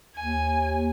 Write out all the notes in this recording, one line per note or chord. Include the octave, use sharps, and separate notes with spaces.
D#2 G#5